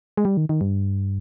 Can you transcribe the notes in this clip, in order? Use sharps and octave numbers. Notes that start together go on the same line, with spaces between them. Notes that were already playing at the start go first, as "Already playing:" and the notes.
G#3
G3
D#3
D#3
G2